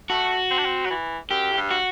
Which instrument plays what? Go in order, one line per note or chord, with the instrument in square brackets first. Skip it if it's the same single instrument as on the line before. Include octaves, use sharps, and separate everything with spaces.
[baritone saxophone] A3 [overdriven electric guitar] F#4
[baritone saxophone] C4
D4
C4
F#3
E3
[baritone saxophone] F#2 [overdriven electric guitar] G4
[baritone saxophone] A2
G2
[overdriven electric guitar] F#4